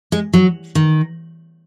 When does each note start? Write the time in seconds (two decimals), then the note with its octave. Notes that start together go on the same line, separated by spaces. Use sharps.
0.12 G#3
0.33 F#3
0.75 D#3